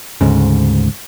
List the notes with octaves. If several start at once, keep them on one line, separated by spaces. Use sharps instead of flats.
D2 G#2 C#3